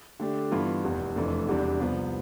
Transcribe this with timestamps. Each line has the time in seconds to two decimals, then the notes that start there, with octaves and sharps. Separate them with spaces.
0.20 D3 A3 D4 G4
0.51 G2 E3 B3 F4
0.84 F1 E2 C3
1.16 F1 F2 E3 A3 D4
1.48 E1 E2 C3 G3 D4
1.80 C2 C3 F3 B3